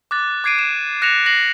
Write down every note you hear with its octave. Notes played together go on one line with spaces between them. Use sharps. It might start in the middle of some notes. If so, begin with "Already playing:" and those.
D6 F#6 A6
D6 G#6 C7 D7 D#7
E7
F#6 A#6 C#7 E7 F7
A#6 C7 D7 F#7